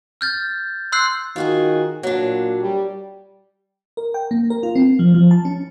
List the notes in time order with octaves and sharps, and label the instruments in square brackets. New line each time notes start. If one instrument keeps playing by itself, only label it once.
[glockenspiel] F6 G6 A6
C6 E6 F#6 G6 C7
[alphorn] D#3 [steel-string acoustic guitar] F4 F#4 G#4
[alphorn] A#2 [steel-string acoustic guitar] F#3 D4
[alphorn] G3
[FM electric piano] A#4
G5
A#3
A#4
F4
C4
F3
F3
A5
C#4